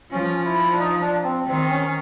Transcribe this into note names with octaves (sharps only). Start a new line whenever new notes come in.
F3 C#4
E4
D4
D#4
D4
C4
D#3 C4
C#4